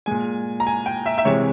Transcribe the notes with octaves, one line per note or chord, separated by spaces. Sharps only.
A#2 G#3 G#5
A#5
G#5
G5
E5
E5
C3 E3 G#3 C#5